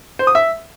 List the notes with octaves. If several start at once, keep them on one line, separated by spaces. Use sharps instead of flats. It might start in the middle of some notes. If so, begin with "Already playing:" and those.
C5
D#6
E5